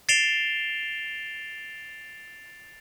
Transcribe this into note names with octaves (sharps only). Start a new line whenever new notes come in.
A6 C7 D7 E7 F7 G7